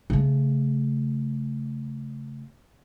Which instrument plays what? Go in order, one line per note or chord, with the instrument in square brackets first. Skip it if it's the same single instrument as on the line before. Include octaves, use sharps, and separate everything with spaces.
[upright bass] C#3 A3